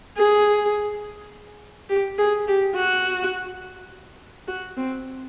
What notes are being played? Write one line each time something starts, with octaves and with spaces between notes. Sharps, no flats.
G#4
G4
G#4
G4
F#4
F#4
C4